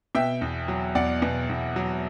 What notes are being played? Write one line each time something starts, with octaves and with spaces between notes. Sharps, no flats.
B2 E5 G5
E2
F#3
E2 D5 F#5
B2
E2
F#3